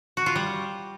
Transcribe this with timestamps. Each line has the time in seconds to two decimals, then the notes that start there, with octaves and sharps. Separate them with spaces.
0.17 F#4
0.26 F4
0.36 G3